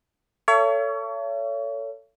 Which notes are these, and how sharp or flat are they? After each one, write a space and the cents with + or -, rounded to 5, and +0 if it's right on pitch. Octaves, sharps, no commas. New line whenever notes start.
A4 +25 C#5 +30 E5 +45